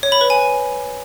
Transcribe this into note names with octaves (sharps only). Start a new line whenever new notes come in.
C#5
B5
B4
G#5